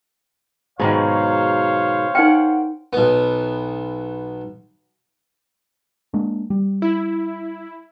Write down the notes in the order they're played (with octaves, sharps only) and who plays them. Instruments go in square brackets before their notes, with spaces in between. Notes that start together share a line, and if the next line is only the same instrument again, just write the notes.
[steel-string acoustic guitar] G#2 B2 [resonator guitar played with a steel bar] D#3 F#3 G#4 [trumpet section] C5 C#5 F5
[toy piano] D#4 G5 [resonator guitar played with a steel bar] A#4 F#5
[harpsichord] B1 B3
[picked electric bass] G#3 A#3 D4
G3
[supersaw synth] E4